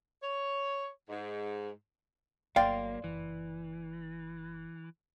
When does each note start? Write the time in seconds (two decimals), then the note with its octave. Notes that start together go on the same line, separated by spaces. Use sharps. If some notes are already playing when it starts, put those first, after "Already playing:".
0.23 C#5
1.09 G#2
2.56 G1 F#3 A3 A#3 D5 F5 G5 C6
3.04 F#1 E3